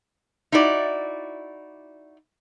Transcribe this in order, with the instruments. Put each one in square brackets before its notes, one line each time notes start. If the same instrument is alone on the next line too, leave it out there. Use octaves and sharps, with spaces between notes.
[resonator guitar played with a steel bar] D#4 E4 F#4 A#4 D5